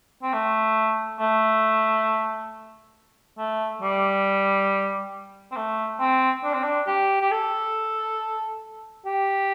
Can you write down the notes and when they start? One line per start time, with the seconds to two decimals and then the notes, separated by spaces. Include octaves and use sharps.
0.23 C4
0.33 A3
1.20 A3
3.38 A3
3.82 G3
5.52 C4
5.56 A3
6.00 C4
6.44 D4
6.54 C4
6.63 D4
6.87 G4
7.21 G4
7.31 A4
9.06 G4